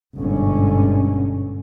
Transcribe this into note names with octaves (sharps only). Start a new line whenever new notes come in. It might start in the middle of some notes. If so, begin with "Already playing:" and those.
G1 G#2 B2 D3 C#4